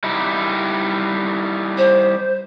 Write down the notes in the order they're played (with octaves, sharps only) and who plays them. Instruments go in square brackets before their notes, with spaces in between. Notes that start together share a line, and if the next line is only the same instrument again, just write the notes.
[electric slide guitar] G3 D#4 E4
[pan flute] C5